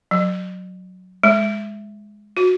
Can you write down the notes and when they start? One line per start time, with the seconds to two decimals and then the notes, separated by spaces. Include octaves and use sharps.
0.11 F#3
1.23 G#3
2.37 F#4